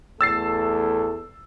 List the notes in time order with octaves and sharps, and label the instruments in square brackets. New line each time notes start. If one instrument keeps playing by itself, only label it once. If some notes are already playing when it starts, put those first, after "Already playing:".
[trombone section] E2 A3 A4 [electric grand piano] E6 A6 C7